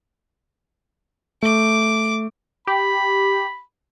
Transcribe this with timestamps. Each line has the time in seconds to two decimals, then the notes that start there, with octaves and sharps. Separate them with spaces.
1.43 A3 D6
2.67 G4 B5